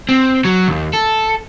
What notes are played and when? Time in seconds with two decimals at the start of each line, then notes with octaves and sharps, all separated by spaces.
0.09 C4
0.45 F#3
0.68 D#2
0.93 A4